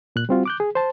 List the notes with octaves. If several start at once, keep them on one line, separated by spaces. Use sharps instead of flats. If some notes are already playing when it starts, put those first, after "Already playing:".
A#2 F#6
G3 C4 F4 F#4
D6 F#6 G6
G#4
C5 A5